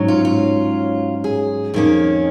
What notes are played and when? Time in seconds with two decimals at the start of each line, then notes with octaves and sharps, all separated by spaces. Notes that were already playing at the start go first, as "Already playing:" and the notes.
Already playing: G#2 F#3 C#4
0.08 F4
0.25 F4
1.24 G#4
1.74 F2 D#3 A#3 C#4